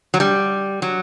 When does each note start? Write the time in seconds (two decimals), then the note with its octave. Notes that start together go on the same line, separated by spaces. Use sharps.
0.14 F#3
0.20 G3
0.82 F#3